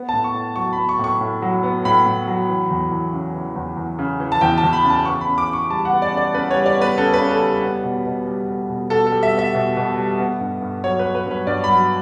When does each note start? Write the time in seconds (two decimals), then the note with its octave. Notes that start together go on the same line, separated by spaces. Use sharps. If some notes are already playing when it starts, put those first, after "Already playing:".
Already playing: B3
0.09 A5
0.13 A2
0.24 C#6
0.34 A2
0.56 F#3 C#6
0.73 B5
0.77 B3
0.89 C#6
0.99 A2
1.04 C#6
1.21 A2
1.42 F#3
1.63 B3
1.85 A2 B5
2.06 A2
2.28 F#3
2.49 E3
2.70 E2
2.92 E2
3.13 C#3
3.34 E3
3.55 E2
3.77 E2
3.99 C#3
4.20 E3
4.32 A5
4.41 E2 G5
4.58 A5
4.63 E2
4.73 B5
4.84 C#3
4.90 A5
5.05 B3 C#6
5.21 B5
5.27 C#3
5.38 D6
5.49 C#3 C#6
5.70 G3 A5
5.85 F#5
5.91 B3
6.02 D5
6.12 C#3
6.17 D5
6.34 C#3 B4
6.51 C#5
6.55 G3
6.66 D5
6.77 B3 B4
6.98 C#3 A4
7.14 B4
7.20 C#3
7.31 A4
7.41 G3
7.62 B3
7.84 B2
8.06 B2
8.27 G3
8.48 B3
8.70 B2
8.90 B2 A4
9.07 A4
9.12 G3
9.23 E5
9.34 B3 E5
9.55 B2
9.77 B2
9.97 G3
10.20 B3
10.41 G2
10.61 G2
10.84 F#3 C#5
10.99 B4
11.04 B3
11.15 B4
11.26 G2
11.31 B4
11.47 G2 D5
11.64 B5
11.68 F#3